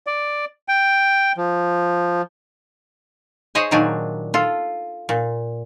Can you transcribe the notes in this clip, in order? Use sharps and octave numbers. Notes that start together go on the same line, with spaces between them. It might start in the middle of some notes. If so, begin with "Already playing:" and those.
D5
G5
F3
G#4 C5 C#5 D#5 G#5
A#2 D#3 F#3 D4 D#4 G#5
F4 A4
A#2